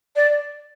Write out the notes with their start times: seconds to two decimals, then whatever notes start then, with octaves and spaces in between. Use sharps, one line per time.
0.16 D5